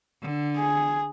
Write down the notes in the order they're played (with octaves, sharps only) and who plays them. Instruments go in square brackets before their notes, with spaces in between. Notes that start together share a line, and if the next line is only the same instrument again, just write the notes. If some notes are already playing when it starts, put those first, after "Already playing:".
[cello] D3
[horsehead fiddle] G#4